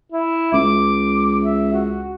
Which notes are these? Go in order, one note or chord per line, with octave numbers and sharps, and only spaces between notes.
E4
C#2 D6
E5
F#4